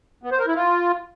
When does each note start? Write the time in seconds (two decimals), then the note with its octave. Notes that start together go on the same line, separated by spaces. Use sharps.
0.23 B3
0.31 C5
0.39 A#4
0.47 E4
0.55 F4